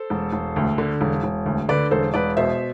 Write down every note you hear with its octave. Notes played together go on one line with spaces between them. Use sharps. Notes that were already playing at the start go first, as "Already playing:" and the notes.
Already playing: A4 C5
E1
E1
D2
D3
E1
E1
D2
D3 B4 D5
E1 A4 C5
E1 B4 D5
B2 C5 E5